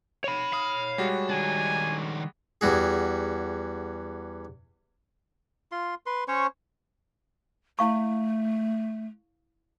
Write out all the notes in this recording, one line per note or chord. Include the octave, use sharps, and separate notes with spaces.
C#5 B5
F5 D#6
G3 G#3 F#4
D#3 D4 G#5
E2 G3 F#4 G#4
F4 C6
B4 C6
C#4 C5 C#5 C#6
A3 E4 F5 C#6